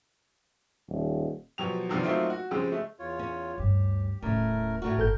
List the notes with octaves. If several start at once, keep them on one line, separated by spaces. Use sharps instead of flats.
D#1
B2 F3 F#3 G4 F7
C3 D#3 F3 A#3 B3 D4
F#3 A3 A#3 C4 D#4 F4
F#4
C#3 F3 G#3 C4 G4
G#3 A3
E2 F4 C#5
C#4
D2 G2 G4
D#1 A2 C#3 A3 A#4
A2 A3 F#4 A#4
G1 A4 G6